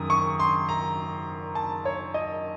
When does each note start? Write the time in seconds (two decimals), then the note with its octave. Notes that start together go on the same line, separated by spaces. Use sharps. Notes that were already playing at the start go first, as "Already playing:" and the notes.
Already playing: F#2 D#3 D#6
0.10 C#6
0.40 C6
0.69 A#5
1.55 A5
1.85 C#5
2.14 D#5